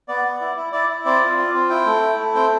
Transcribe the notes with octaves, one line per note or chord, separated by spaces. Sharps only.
B3 D5
B3
E4
E4
E4 D5
E4
C4 D5
F4
F4
C4
E4 G5
A3
E4
A3
C4 G5